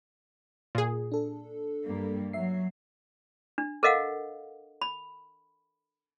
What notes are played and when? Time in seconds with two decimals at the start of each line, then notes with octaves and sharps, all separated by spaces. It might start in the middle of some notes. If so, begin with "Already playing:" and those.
0.75 A#2 G#4
1.12 D4 A4
1.84 G2 G3 A#3
2.33 F#3 E5 C7
3.58 D4
3.83 A4 A#4 D#5 F5 F#5
4.82 B5